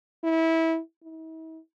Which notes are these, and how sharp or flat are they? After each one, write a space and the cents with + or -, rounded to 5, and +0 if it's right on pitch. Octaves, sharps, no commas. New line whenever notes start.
E4 -20
E4 -45